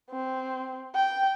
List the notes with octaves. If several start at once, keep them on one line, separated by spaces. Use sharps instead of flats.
C4
G5